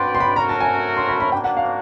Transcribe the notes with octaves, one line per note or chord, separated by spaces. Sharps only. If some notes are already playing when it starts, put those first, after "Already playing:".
Already playing: F#4 B4 D5 G5 C6
C6
B5
A3 C#4 F#4 A#4 A#5
A5
G#5
C6
B5
B5
A#3 D4 F#4 G5
F#5
F5